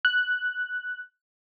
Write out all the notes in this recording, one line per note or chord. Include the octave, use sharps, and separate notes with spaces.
F#6